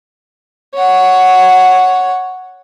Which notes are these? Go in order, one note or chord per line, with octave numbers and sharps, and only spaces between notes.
C#5 F#5